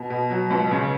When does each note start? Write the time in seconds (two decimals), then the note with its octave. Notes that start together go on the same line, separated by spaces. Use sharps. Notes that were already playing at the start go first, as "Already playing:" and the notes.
Already playing: B2
0.10 B2
0.30 F#3
0.50 C#2
0.71 C#3